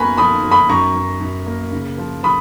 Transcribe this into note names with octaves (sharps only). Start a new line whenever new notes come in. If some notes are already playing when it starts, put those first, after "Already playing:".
Already playing: F#2 A#3 B3 G#5 A#5 B5 C#6
F3 B5 D#6
F3
B5 D#6
F#2 A#5 C#6
F#2
F#2
A#3
C#3
F3
F3 B5 D#6